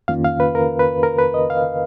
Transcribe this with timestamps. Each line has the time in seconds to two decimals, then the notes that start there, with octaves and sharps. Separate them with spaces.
0.08 F2 D#3 A#3 C#4 F4 F5
0.24 F5
0.40 B4
0.55 A#4
0.79 B4
1.03 A#4
1.19 B4
1.34 D#5
1.50 F5